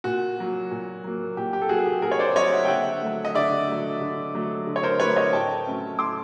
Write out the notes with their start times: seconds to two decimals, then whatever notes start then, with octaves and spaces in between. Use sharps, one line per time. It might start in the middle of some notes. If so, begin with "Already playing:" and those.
0.04 A#2 F#4
0.38 F#3 A#3
0.71 A#2
1.04 F#3 A#3
1.37 A#2 G4
1.53 G4
1.62 A4
1.69 F#3 A#3 F#4 G#4
1.79 G#4
1.86 G4
2.02 A#2 G#4 A#4
2.12 C#5
2.19 C5 D5
2.36 F#3 A#3 C#5 D#5
2.53 E5 F#5
2.65 G5
2.68 D3 E5 F#5
3.01 F#3 A3
3.25 D#5
3.35 D3 D5 E5
3.68 F#3 A3
4.01 D3
4.35 F#3 A3
4.67 D3
4.76 C#5
4.83 A#4 C5
5.00 F#3 A3 B4 C#5
5.16 C#5 D#5
5.33 A2 G5 A5
5.67 F#3 A3 C#4
5.99 A2 C6 D6